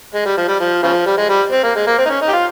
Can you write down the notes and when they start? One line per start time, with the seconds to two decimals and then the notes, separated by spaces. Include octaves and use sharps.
0.14 G#3
0.25 G3
0.37 F3
0.48 G3
0.60 F3
0.83 C#3 F3
1.06 G3
1.17 G#3
1.29 G3
1.52 C4
1.64 A#3
1.75 G#3
1.87 A#3
1.98 C4
2.06 D#4
2.10 C#4
2.21 D#4
2.28 G4
2.33 F4